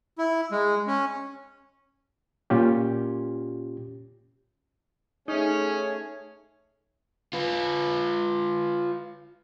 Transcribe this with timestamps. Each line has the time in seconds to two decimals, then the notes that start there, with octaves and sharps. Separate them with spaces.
0.18 E4
0.51 G#3
0.87 C#4
2.50 A#2 C#4 F4 G4
5.28 A3 C#4 D#4 G#4 C#5
7.33 F4 B4